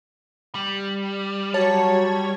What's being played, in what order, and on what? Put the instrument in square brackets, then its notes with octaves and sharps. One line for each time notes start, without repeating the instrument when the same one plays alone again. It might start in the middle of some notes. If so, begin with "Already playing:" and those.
[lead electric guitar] G3
[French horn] F#3 [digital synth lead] C#5 [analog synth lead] A5